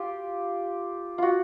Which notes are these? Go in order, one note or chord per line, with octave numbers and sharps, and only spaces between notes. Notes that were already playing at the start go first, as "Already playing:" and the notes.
Already playing: F4 G4
F4 F#4